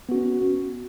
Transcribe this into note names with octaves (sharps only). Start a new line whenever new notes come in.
B3 C#4 F#4